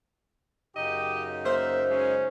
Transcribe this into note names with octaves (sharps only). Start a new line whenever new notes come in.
F#2 C#3 D#4 G4 D#5
A#3 C5 E5
G#3 C#4